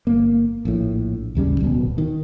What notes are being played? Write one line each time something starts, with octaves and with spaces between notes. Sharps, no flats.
G1 A#3
A#1 A2
A1 D#2 C#3 G3
D1 B2
D#3